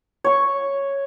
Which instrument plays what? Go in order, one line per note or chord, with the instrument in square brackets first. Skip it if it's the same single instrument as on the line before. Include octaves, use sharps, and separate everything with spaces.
[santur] C#5 C#6